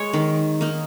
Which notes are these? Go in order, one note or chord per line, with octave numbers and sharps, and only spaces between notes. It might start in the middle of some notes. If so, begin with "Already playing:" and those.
Already playing: G#3 C#5
D#3
A#3 D#4